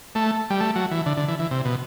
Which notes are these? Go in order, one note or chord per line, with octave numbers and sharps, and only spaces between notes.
A3
G3
A3
F#3
E3
D3
D3
E3
E3
C3
B2